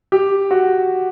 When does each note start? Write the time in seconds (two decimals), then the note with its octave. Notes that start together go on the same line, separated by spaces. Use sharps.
0.12 G4
0.51 F#4